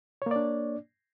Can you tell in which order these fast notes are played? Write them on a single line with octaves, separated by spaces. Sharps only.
C#5 A#3 D5 D4